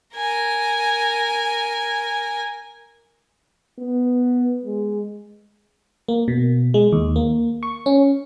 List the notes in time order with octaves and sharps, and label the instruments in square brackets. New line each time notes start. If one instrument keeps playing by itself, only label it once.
[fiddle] A#4 G#5
[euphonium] B3
G#3
[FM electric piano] A#3
B2
G#3
D#2
A#3
C#6
C#4